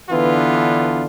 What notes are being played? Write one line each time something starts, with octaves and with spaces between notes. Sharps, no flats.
D3 E3 B3 D4 F4